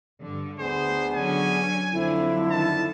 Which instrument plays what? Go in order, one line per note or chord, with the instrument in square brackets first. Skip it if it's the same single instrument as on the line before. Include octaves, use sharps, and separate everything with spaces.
[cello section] G2 D3
[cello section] D2 [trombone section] B3 D4 G#4 [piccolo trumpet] C5
[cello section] D3 F#3 C#4 [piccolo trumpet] G#5
[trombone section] F2 D3 [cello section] F#3 C4 D4 [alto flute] E4
[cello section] D#3 [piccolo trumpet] A5